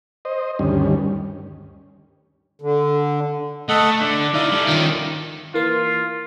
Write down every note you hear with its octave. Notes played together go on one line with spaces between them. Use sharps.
C5 D#5
D2 G2 D#3 G3 C#4
D3
A3 A4 D#5 F#5
D3 D5
D#4 E4 D5 E5 F5
G3 A4
D#3 F3 C#4 D5
E3 A#3 F4 C6